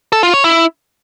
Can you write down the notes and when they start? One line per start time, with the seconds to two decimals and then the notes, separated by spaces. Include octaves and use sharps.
0.12 A4
0.23 F4
0.34 C#5
0.44 E4